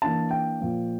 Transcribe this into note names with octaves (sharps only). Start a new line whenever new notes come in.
E3 A#3 D4 A5
G5
A#2 F3 A#3